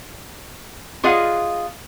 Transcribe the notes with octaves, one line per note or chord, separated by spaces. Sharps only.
F4 G#4 D#5 F5 F#5